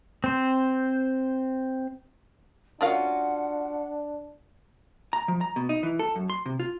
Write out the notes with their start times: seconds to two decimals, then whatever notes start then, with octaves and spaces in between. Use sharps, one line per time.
0.24 C4 C5
2.81 A3 C#4 D4 F4 F#4 A#4 F5 F#5
5.13 A#5
5.28 F3
5.41 A#5
5.56 B2
5.69 D#4
5.83 E3
5.99 A4
6.16 F#2
6.30 C6
6.46 C3
6.60 F4